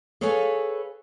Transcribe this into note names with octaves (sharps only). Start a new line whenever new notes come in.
G#4 A4 B4 C#5 F5 G#5